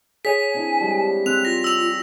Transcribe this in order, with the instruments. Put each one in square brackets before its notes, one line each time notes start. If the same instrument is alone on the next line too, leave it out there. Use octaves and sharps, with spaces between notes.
[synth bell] G#4 C#5 [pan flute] G#5 [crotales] B6
[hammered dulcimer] C4 D4 E4
F3 G3 G#3
[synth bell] C4 [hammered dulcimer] C#5 G5 [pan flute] F#6 [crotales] F7
[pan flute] F4 [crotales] A#6
[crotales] E6 F7